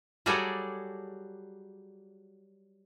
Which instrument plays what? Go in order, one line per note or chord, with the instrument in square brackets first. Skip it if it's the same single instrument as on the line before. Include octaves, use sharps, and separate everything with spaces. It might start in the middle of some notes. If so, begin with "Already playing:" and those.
[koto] F#3 G3 F#4 G#4 A4 D5